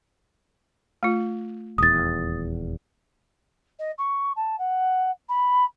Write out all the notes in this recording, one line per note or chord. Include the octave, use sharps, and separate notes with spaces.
A3 F4
D#1 E2 D#6 A6
D#5
C#6
A5
F#5
B5